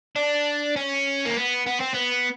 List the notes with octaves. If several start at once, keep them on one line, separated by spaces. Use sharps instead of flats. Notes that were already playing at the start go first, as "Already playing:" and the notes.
D4
C#4
A#3
B3
B3
C4
B3